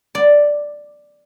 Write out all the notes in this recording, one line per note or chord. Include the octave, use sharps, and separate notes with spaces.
D5